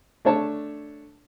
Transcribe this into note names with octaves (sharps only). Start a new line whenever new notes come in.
A3 D4 C#5 A5